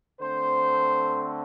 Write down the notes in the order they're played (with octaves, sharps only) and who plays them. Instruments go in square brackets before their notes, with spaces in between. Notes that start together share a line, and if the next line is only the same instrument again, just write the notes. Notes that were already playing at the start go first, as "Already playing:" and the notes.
[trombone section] D3 A3 C4 C5